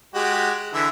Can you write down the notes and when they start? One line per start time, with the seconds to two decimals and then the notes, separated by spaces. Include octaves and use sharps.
0.15 G#3 F#4 G4
0.74 D3 E3 E5